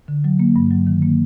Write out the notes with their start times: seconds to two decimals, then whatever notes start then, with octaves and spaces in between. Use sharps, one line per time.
0.08 D3
0.24 F#3
0.40 A#3
0.56 G2
0.71 F#3
0.87 D#3
1.02 A#3